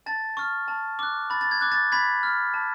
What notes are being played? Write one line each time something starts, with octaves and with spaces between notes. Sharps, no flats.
A5 A6
C#6 F6
A5
D6 F#6
B5 A6
A6
G#6
D6 F#6
A6
B5 G#6 B6
F6
A5